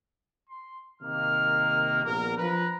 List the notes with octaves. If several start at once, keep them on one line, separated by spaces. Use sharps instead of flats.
C6
C3 D#3 A#3 F6
A#1 B3 A#4
F3 B4 A#5